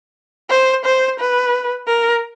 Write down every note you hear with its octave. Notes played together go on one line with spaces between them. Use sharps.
C5
C5
B4
A#4